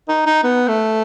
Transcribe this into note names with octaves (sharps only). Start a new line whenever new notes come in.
D#4
D#4
B3
A3